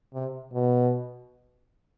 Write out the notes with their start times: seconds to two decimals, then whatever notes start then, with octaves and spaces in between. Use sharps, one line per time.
0.13 C3
0.53 B2